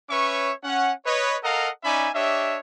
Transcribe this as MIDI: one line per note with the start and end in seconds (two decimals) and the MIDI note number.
0.10 0.52 61
0.10 0.52 71
0.10 0.52 73
0.10 0.52 76
0.10 0.52 85
0.64 0.91 61
0.64 0.91 78
1.06 1.36 71
1.06 1.36 73
1.06 1.36 75
1.43 1.69 69
1.43 1.69 70
1.43 1.69 75
1.43 1.69 77
1.43 1.69 78
1.43 1.69 82
1.84 2.09 61
1.84 2.09 63
1.84 2.09 74
1.84 2.09 76
1.84 2.09 80
1.84 2.09 83
2.14 2.59 62
2.14 2.59 67
2.14 2.59 73
2.14 2.59 75
2.14 2.59 76